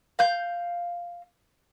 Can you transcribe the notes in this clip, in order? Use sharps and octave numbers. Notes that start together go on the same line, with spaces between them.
F5 G6